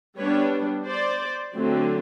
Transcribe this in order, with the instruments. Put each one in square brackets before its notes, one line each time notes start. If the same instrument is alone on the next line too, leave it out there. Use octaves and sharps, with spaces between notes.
[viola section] G3 B3 D4 B4 C#5
C5 D5
D3 F#3 A3 C4